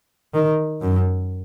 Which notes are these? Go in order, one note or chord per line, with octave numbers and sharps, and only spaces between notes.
D#3
F#2